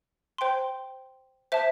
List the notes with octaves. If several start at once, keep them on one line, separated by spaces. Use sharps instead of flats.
C5 G5 C6
C5 E5 A5